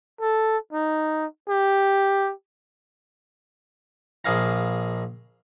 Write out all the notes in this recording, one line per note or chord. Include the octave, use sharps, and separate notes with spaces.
A4
D#4
G4
A#1 G#4 F5 A#5